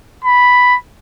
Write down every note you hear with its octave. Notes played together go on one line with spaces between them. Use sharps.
B5